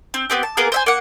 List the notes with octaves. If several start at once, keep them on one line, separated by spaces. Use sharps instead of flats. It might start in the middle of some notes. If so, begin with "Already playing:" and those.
C4
B3 C4 G4
A5
A#3 B3 G#4 A#4
C5 E5 G#5
A#3 F#5